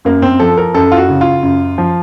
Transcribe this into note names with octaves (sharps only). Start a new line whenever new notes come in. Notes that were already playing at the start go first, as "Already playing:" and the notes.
F#2 A#3
C4
F3 A4
A#4
F#2 A4
F4
F#4
C#3
F4
F#2
F3